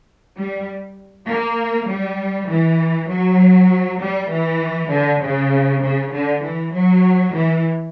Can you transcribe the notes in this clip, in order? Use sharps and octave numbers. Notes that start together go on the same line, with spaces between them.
G3
A#3
G3
E3
F#3
G3
E3
D3
C#3
C#3
D3
E3
F#3
E3